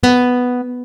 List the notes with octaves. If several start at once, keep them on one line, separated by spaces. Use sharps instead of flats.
B3